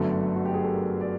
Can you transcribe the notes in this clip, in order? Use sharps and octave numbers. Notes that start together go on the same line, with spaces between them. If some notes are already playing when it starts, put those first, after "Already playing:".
Already playing: G1 F#2 D3 F#3 A3 A4
F#4
G4
G#4
A4
A#4
D5